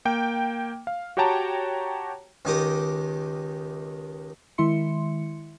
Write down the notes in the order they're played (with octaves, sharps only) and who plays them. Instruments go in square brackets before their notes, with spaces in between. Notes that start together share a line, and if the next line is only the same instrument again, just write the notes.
[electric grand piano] A#3 G5
F5
F#4 G4 C#5 G5 A5 A#5
[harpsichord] C#2 D#3 G4 D6 D#6
[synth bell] D#3 G#3 E4 E5 C6 C#7